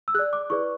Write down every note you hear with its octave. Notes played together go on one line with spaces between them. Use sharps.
E6
G#4 D5 F#6
D6
E4 G#4 B4 D5 C#6